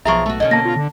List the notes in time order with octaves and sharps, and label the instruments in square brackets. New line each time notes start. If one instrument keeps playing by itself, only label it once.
[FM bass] B1 [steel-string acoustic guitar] F3 G#4 A#5 [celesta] E5 C#6
[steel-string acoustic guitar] A3 F#4
[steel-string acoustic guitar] B2 D3 C#4 [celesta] D#5
[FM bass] A#3 [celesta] A5 A#6
[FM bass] F4
D3